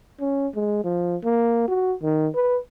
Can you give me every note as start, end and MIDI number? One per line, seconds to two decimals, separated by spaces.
0.20 0.47 61
0.55 0.83 56
0.84 1.16 53
1.24 1.64 58
1.68 1.94 66
2.03 2.28 51
2.35 2.58 71